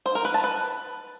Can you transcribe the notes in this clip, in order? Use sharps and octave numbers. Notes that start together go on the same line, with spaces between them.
C5
A#4
B4
A5
B4